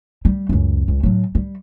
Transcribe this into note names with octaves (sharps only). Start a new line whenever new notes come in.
G3
C#2 F#2
C#2
A2 F#3
G3